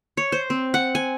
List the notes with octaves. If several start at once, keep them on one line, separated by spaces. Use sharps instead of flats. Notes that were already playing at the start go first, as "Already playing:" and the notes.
C#5
C5
C4
F#5
G#5